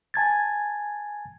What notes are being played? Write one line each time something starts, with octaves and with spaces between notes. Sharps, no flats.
G#5 A5 G#6 A6